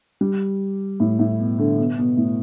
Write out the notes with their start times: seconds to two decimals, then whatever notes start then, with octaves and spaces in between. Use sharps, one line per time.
0.21 G3
1.00 A2
1.19 A2
1.39 B2
1.59 D3
1.78 B2
1.99 B2
2.17 A2